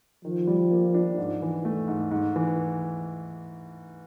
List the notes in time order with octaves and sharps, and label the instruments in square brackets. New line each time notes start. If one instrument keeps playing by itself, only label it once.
[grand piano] D#3 [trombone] F3
[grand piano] G3
A#3
D4
G#2
E3
A3
G#2
G#2
E3